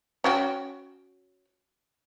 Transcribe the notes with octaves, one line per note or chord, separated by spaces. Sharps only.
C#4 F#4 G5